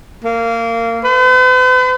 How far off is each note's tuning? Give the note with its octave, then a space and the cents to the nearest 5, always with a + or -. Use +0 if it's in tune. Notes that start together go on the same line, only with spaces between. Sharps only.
A#3 -20
B4 +45